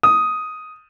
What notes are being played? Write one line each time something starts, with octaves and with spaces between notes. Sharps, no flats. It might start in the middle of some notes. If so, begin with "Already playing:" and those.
D#6